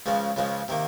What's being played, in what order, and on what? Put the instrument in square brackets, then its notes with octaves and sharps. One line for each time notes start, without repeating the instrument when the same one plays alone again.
[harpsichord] C#2 C#3 F3 G#3
C#2 C#3 F3 G#3
C3 D#3 A#3